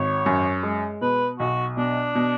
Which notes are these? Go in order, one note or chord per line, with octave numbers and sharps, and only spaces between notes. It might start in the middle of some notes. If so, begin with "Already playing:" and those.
Already playing: G#1 C#5
F#2
G#3
B2 B4
B1 F#4
B2 D4
B2